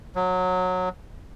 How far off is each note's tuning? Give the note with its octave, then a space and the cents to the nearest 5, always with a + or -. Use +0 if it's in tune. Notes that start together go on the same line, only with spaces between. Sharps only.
F#3 -15